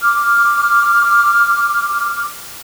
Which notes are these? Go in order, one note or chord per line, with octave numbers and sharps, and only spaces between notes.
D6 F6